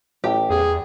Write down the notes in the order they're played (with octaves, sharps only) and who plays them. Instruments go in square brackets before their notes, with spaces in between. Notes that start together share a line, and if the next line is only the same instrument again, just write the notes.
[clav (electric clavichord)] A1 [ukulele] G4
[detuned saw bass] E2 [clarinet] G#4